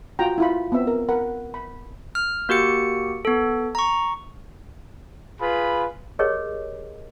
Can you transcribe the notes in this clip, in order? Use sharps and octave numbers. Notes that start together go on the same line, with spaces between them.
F4 F#4 G5 A#5
E4 F4 B5
B3 C4 E5
A#4
A#4 F#5 B5
B5
F6
A#3 F#4 G4 C#7
B3 A4
A#5 C#6
F4 G#4 B4 B5
G4 G#4 A#4 C#5 D#5